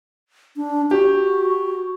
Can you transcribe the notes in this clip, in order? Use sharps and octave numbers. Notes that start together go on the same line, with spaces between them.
D4
F#4 G4